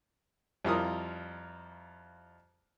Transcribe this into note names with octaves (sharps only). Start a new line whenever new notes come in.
F2 G3 E4 F4 A#4 D#6